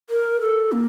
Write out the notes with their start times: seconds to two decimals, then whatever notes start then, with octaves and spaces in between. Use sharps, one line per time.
0.10 A#4
0.40 A4
0.72 A#3